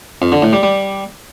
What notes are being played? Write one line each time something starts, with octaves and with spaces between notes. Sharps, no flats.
F2
D3
A2
G3
G3